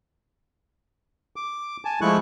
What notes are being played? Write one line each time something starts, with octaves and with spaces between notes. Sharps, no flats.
D6
G#5 A5
F3 G#3 A3 E4 C#6 F#6